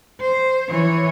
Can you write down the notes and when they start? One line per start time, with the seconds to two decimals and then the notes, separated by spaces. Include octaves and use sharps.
0.21 C5
0.69 E3 C#5